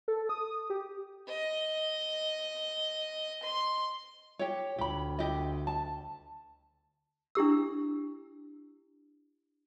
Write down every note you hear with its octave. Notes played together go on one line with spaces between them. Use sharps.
A4
D#6
G4
D#5
C6
G4 C#5
D2 G4 B5
G4 D#5
A5
D4 E4 G4 E6